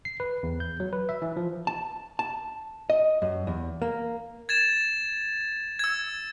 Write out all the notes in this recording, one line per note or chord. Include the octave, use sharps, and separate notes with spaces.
C7
B4
E2
G6
F#3
B4
E5
E3
F3
A5
A5
D#5
F#2
E2
A#3
G#6 A6 E7
E6 G#6